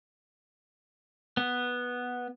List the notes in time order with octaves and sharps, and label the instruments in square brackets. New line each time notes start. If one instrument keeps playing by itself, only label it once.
[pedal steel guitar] B3